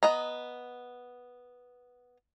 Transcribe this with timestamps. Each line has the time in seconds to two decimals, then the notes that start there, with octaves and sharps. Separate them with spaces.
0.03 B3 D#5 A#5